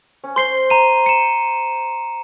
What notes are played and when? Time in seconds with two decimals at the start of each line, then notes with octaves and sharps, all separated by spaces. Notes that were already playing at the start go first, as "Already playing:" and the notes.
0.24 C#4
0.36 C5 C6 C7 G7
0.70 A#5 D#7
1.06 C#7 E7